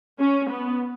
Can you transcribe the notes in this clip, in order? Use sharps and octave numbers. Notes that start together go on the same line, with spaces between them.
C#4
B3